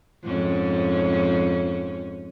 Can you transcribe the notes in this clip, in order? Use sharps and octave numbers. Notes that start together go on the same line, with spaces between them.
F2 G#2 C#4